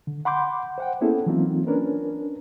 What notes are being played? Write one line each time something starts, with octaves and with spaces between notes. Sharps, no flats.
D3
F#5 B5 C6 D6 G6
C5 F#5 G5
A#3 B3 C#4 E4 G#4 A4
E3 F#3 A#3 C4 D#4 F4
C#4 D4 A#4 B4